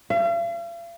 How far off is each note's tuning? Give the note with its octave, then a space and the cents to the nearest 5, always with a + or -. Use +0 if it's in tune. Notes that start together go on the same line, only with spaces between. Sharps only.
F5 -45